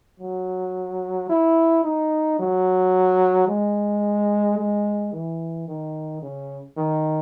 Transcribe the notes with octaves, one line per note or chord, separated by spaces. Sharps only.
F#3
E4
D#4
F#3
G#3
G#3
E3
D#3
C#3
D#3